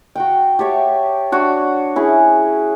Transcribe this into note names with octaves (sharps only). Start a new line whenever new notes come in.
F#4 F#5 G5
G4 A4 C#5 E5
D4 F#4 C#5
C#4 E4 G#4